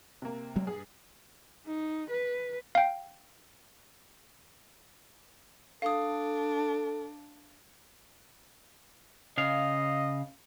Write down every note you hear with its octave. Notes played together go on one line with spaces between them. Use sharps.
C3 A#3
F#3 G#3 C4
G2 G#4
D#4
B4
F5 G5
D4 A4 F5 D#6
C#3 D#5 F5